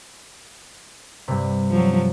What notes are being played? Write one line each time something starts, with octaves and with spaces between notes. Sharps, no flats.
G2 C3
F3 F#3